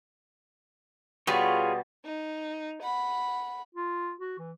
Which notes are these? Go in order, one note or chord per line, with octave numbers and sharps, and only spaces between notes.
B2 G3 B3 F4 G#4 C#5
D#4
F#5 B5
F4
F#4
E3